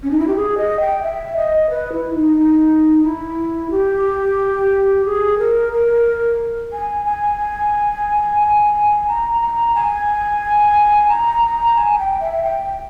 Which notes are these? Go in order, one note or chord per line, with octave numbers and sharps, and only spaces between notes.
C#4
D#4
E4
G4
G#4
D#5
G5
E5
D#5
B4
E4
D#4
D#4
E4
G4
G#4
A#4
A#4
G#5
G#5
G#5
A#5
A#5
G#5
A#5
A#5
G#5
G#5
G5
E5
G5